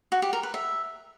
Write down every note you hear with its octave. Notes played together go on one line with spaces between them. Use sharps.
F#4
G4
A#4
B4
E5